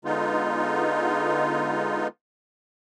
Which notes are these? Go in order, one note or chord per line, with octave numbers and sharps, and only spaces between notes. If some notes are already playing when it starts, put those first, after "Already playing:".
D3 G#3 B3 D#4 F4